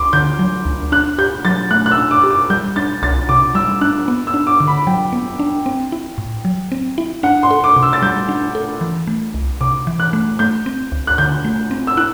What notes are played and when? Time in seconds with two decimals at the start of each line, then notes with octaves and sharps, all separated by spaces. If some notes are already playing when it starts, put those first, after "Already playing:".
Already playing: D2 C6 D6
0.13 D3 G6
0.39 F#3
0.65 D2
0.92 D4 F#6
1.18 G4 G6
1.45 F#3 A6
1.71 A3 F#6
1.86 F#6
1.91 E6
1.98 D4
2.11 D6
2.24 G4
2.30 D6
2.50 G3 G6
2.76 D4 A6
3.02 C2 A6
3.29 C3 D6
3.55 G3 E6
3.81 D4 F#6
4.08 B3
4.27 E6
4.34 D4
4.47 D6
4.60 D3
4.67 B5
4.87 F#3 G5
5.13 B3
5.39 D4
5.66 C4
5.92 E4
6.18 A2
6.45 F#3
6.72 C4
6.98 E4
7.23 D4 F#5
7.43 C6
7.51 A4
7.64 D6
7.76 C3
7.83 E6
7.93 A6
8.02 G3 G6
8.29 D4
8.55 A4
8.81 E3
9.07 A3
9.34 C2
9.61 C3 D6
9.87 E3
10.00 F#6
10.13 A3
10.39 A3 G6
10.66 C4
10.92 D2
11.07 F#6
11.18 D3 G6
11.45 A3
11.71 C4
11.87 E6
11.97 E4 F#6